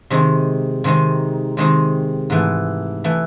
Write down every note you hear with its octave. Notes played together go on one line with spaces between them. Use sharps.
C3 D#3 G#3 C4 D#4
C3 D#3 G#3 C4 D#4
C3 D#3 G#3 C4 D#4
G#2 E3 A3
E3 A3